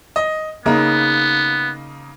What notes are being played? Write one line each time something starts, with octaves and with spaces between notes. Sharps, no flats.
D#5
C#3 A#3 B3 D#4